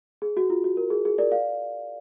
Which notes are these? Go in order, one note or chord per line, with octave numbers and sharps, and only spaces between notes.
G#4
F#4
F4
F#4
A#4
G#4
G#4
A#4 D5
D5 F5